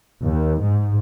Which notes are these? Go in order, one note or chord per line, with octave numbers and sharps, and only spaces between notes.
D#2
G#2